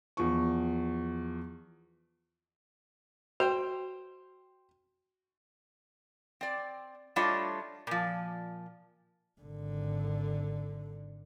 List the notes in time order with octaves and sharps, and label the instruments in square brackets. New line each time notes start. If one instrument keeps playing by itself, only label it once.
[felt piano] E2 F3 C#6
[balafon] F#4 [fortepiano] C5 G5
[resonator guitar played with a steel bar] C4 D5
G3 A3 D4 F4 C#5 D#5
A#2 F3
[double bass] G#1 D3